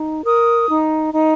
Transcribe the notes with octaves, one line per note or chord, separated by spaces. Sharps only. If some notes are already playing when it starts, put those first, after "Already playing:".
Already playing: D#4
A#4 D#6
D#4
D#4